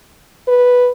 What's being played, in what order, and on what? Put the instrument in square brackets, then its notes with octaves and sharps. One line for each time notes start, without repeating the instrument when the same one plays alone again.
[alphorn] B4